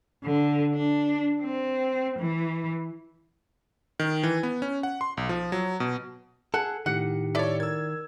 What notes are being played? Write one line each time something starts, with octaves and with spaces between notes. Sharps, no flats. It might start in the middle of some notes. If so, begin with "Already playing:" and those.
D3
D4
C4
E3
D#3
E3
B3
C#4
F#5
C6
B1
F3
F#3
B2
G#4 A4 F#5
A2 D#3 G4 F#5 C#7
E4 A4 C#5 D5
A#4 E6 G#6